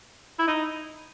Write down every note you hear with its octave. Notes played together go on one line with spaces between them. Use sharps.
E4
D#4